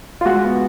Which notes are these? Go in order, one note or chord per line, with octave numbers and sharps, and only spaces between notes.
F4
G#3 F#4
B3